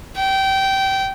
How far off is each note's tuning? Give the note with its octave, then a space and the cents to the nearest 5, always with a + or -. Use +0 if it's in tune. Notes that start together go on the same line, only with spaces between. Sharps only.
G5 -20